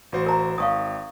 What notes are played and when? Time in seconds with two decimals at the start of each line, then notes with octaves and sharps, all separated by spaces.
0.12 A1 F#4 C5
0.26 A#4 A#5
0.58 G#1 F5 C#6 D#6